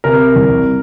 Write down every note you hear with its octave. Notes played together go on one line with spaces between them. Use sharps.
C3 A#4
C2